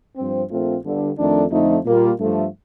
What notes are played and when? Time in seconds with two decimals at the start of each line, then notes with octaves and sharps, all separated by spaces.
0.16 G2 F3 C4
0.50 A#1 A#2 A3 C4 F4
0.83 G1 G2 D3
1.18 F2 D#3 A3 D4
1.51 F2 D3 F3 A3 D#4
1.85 A#2 G3 A#3 F4
2.19 G2 F3 A3